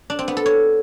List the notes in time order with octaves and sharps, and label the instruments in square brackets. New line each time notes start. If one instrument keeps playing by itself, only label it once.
[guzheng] D4
C4
B3
A4
C#5